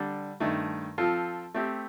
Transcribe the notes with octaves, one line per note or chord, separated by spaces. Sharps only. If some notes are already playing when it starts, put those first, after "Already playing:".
Already playing: D3 G3 D4
G2 D#3 A3
F3 C4 F4 A4
A3 C4 G4